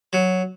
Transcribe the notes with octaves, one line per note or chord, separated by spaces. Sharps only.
F#3